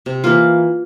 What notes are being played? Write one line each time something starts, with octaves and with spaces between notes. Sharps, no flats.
C3
E3 A#3 F4